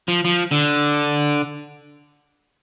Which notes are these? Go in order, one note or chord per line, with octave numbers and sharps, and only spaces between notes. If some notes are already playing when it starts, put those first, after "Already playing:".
F3
F3
D3